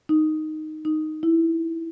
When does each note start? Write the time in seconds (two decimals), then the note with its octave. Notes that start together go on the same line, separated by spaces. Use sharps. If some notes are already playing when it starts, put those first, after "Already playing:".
0.09 D#4
0.85 D#4
1.23 E4